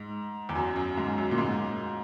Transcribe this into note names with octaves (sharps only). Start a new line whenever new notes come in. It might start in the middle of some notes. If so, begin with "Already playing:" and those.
Already playing: G#2
E2
F#2
F#2
G#2
F#2
A#2
G#2